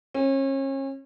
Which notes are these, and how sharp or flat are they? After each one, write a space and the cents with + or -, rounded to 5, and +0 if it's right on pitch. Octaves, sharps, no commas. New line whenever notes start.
C#4 -35